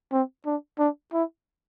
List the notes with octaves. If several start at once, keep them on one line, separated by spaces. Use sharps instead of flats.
C4
D4
D4
E4